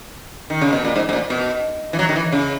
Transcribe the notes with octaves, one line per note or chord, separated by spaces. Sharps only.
D#3
C#3
B2
A#2
G#2
G#2
A#2
B2
E3
F#3
D#3
E3
C#3